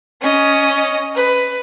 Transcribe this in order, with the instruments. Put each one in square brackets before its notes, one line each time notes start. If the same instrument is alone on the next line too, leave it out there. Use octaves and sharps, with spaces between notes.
[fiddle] C#4 D#5
B4